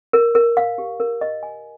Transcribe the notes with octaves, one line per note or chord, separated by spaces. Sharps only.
A#4
A#4
F5
G4
A#4
D#5
G#5